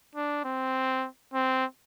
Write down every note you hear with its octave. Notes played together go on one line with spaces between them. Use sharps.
D4
C4
C4